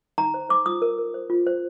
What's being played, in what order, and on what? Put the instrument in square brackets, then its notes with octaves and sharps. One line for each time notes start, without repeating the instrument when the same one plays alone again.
[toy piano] D#4 A#5
C5
C5 D6
F4 D#6
A#4
A#4
C5
F4
C5